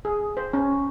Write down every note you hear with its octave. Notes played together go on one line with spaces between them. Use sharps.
G#4
C5
C#4